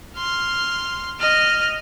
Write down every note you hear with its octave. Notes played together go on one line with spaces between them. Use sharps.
C6 F6
D#5 F6